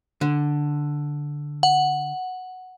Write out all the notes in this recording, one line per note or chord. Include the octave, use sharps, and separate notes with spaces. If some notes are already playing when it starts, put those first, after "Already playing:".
D3
F#5